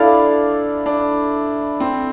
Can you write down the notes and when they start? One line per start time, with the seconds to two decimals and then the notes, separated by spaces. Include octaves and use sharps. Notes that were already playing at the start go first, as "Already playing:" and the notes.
Already playing: D4 E4 A4 D5 F5
0.86 D4
1.80 C4